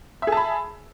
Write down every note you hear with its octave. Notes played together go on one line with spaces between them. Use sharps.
G#4 E5 A5 B5